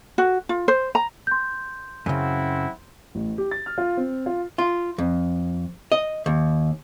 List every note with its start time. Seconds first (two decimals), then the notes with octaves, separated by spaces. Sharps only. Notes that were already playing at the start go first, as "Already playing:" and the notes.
0.18 F#4
0.49 F4
0.68 C5
0.95 A#5
1.27 C6 G6
2.06 F#2 A#2 C#3 C4 E4 F#5
3.15 A1
3.38 G4
3.51 A6
3.66 F6
3.78 F4
3.97 C4
4.26 F4
4.58 F4
4.98 F2
5.92 D#5
6.26 D#2